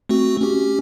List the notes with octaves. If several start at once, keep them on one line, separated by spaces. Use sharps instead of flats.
A3 C4 F#4
C#4 G4